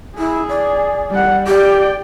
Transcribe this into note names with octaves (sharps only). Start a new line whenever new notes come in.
E4 G#4
D5
G3 F#5
G4 D5 G5